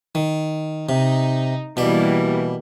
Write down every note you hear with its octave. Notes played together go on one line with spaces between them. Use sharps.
D#3
C3 D#4
B2 E3 G3 A#3 D5